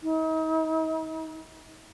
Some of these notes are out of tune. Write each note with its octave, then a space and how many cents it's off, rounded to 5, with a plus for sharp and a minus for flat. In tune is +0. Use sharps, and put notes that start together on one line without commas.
D#4 +40